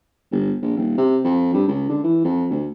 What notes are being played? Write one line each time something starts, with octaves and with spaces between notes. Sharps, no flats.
G1
A#1
D#1
C3
F2
G2
C#2
D3
E3
F2
D2